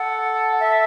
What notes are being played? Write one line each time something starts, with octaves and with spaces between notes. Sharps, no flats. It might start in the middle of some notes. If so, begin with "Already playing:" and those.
Already playing: A4 F#5
E5